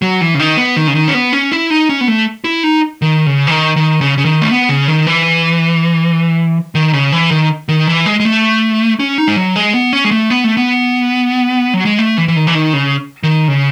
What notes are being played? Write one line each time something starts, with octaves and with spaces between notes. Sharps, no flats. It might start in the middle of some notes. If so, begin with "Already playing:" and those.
F#3
E3
C#3
D#3
B3
D#3
C#3
D#3
C#4
B3
C#4
E4
D#4
C#4
B3
A3
E4
D#4
D#3
C#3
E3
D#3
D#3
C#3
C#3
D#3
A3
B3
C#3
D#3
E3
D#3
C#3
E3
D#3
D#3
E3
G#3
G#3
A3
C#4
D#4
G#3
F#3
G#3
B3
C#4
G#3
A3
B3
A3
B3
F#3
G#3
A3
E3
E3
D#3
E3
D#3
C#3
D#3
C#3